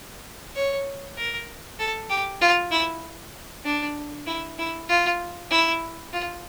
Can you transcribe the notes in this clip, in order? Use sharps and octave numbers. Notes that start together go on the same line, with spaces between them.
C#5
A#4
A4
G4
F4
E4
D4
E4
E4
F4
E4
F4